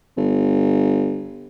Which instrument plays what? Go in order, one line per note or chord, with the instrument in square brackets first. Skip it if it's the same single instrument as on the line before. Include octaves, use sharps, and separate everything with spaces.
[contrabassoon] G1